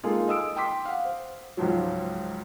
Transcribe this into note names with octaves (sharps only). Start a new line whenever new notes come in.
G#3 A#3 D#4 F4 G#4 A4
D#5 D#6 E6 D7
G5 C6 D6 B6
F5 F#5
C5
C#2 G#2 F3 F#3